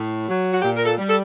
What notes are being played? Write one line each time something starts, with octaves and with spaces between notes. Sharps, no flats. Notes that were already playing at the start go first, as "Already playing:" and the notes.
Already playing: A2
F#3
F#4
A#2 G4
A#4
A4
G3
A4